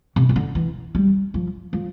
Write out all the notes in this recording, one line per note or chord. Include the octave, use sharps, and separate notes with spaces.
C3
C3
D3
E3
G3
F3
F3